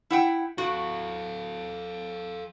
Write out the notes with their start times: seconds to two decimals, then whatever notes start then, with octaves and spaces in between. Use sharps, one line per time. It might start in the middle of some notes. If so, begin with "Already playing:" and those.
0.10 E4 F#5 G5
0.58 F#4 A4 F5